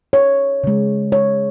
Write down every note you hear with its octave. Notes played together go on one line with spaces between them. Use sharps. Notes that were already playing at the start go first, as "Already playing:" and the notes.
C#5
C#3 G#3
C#5